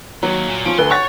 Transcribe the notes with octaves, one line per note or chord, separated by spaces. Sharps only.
D#2 D#3 F#3
A#2
F3 C#4 D7
D2 A4 B4 C6
C#5 F#5 C#6 A6